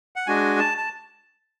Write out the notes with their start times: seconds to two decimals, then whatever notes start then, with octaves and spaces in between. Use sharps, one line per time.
0.16 F#5
0.27 G#3 D4 F#4 G#5
0.59 A5
0.78 A5